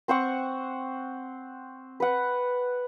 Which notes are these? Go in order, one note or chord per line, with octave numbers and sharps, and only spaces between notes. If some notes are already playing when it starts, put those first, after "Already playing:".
C4 C5 F#5 C#6
B4 F#5